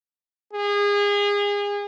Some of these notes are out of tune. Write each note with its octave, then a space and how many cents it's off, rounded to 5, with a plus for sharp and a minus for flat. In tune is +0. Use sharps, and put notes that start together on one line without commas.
G#4 -30